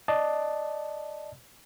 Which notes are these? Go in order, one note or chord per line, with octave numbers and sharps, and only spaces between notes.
D5 D#5 A5